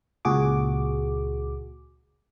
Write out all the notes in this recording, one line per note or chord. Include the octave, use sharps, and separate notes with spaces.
C#2 A#2 F#4 G#4 D6